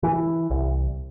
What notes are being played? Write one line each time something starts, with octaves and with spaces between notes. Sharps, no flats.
E3
C2